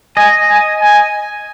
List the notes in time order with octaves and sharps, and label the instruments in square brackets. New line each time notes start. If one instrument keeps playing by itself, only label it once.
[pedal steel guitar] D#5 [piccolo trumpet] G#5
[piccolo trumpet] G#5
G#5